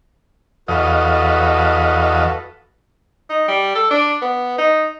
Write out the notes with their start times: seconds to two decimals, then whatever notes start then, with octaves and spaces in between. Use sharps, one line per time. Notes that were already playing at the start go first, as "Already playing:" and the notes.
0.68 E2 F#4 A4 B4 D#5 F5
3.29 D#4
3.48 G3
3.75 A4
3.91 D4
4.22 B3
4.58 D#4